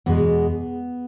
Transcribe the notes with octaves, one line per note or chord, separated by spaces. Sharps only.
E2 B2 G#3 B3